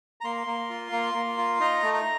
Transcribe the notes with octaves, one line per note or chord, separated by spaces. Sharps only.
A#5
A#3 C6
A#3
F4
A#3
A#3
F4
D#4 A#5
A3
A#5